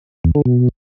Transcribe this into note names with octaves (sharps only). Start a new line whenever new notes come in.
E2
D3
B2